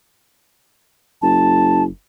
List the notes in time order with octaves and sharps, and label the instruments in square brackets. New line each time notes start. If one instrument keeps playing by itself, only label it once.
[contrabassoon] F#1 [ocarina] A5